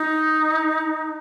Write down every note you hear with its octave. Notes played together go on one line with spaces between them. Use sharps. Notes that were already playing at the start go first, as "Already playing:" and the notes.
Already playing: D#4